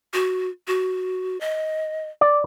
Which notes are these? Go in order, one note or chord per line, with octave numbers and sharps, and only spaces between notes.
F#4
F#4
D#5
D5